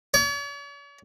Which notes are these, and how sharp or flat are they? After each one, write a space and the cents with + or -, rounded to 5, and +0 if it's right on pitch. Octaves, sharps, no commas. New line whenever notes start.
C#5 +45